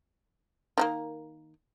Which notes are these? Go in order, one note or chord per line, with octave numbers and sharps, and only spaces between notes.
D#3 F3 A#3